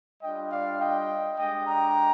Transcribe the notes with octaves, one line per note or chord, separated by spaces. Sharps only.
G3 D4 F4 D#5 G5
D5 F5
D#5 G5
G#3 D4 G4 D#5 G5
G5 A#5